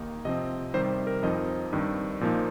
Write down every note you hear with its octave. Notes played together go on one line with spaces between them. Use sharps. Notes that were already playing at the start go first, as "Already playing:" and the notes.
Already playing: D#2 D#3 A#3 D#4
C3 F3 C4 D#5
C3 D#3 G3 C5
A#4
F2 F3 C4 D#4 D#5
G2 D#3 C4
A#2 F3 A#3 D#4